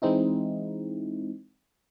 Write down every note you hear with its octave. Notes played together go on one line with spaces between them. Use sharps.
E3 G#3 C4 D#4 E4